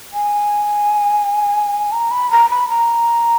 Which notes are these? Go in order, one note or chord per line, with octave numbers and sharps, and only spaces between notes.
G#5
A#5
B5
A#5
B5
A#5